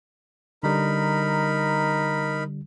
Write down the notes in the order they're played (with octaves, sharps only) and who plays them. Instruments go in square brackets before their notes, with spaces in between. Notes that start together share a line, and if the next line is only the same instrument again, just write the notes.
[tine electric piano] D3 G3 [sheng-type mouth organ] D#4 A#4 B5